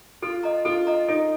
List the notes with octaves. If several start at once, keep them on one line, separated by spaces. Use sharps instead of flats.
F4 A4
D#5 A#5
F4 A4
D#5 A#5
D#4 A4